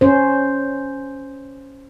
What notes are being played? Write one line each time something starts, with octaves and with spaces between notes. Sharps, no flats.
C#4 C5